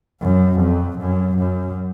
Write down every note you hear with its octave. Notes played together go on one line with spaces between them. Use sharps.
F#2
F2
F#2
F#2